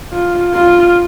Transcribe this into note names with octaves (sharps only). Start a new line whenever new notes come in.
F4
F4